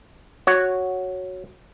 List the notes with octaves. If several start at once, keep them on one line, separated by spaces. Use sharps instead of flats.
F#4 C#5